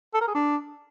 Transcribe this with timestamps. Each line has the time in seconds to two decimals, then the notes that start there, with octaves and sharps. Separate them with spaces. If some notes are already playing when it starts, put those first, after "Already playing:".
0.14 A4
0.21 A#4
0.28 G#4
0.34 D4